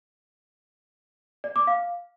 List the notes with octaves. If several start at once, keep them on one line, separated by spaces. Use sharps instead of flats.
D5
D6
F5